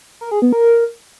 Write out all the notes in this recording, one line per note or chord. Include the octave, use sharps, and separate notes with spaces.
A#4
G#4
B3
A#4